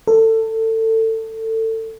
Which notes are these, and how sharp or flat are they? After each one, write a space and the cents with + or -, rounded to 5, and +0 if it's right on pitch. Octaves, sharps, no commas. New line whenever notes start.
A4 +25